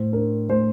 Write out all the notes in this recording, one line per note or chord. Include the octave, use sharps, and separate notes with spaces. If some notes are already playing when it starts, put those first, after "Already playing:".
Already playing: A2 C5
D4 A#4
A2 C5